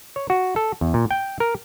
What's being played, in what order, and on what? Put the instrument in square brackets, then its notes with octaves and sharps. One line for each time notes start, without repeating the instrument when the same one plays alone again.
[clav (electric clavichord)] C#5
F#4
A4
E2
A#2
G5
A#4